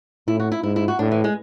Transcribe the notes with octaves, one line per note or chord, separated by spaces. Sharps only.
A2 E4
F#4
E4
G#2 E4
E4
F#4
A2 D4
E3
G#3